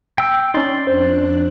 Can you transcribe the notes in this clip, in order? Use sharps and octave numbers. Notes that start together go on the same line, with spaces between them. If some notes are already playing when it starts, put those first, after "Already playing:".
G5 E6
C#4 D#4 D5 C6
F2 D4 C5 F#6